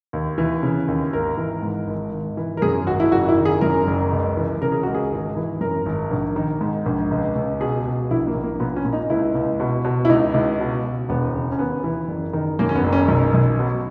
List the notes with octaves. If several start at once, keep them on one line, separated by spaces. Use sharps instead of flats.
D#2
E3
C#3
D#2
G#1 A#4
E3
G#2
G#1
G#1
E3
A#4
F#2 G#4
G#1 F#4
E4
F#1 F#4
E4
D#3
G#4
F#2 A#4
F#1
C#2
E3
C#3 A#4
G#4
C#2 F#4
G#4
G#1
E3
F#2 A#4
G#1
A#1
D#3
G#2
A#1
C#2
C#2
B2 G#4
B2
A#1 E4
A#3
A#1
A#3
A#2 B3
C#4
A#2
D#4
C#2 E4
C#2
B2
B2
E4
C#2 D#4
C#2
B2
B2
E1 B3
C#3
C#4
D#2 B3
E3
F#1
D#3
F#2 A#3
C#4
B3
F#1
C#4
B1
B1
B2